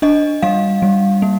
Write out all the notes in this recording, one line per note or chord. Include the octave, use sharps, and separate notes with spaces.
D4 D#5
G3 F5
G3
A#3